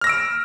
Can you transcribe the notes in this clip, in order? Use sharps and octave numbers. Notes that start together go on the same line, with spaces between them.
E6 F6 A#6 D7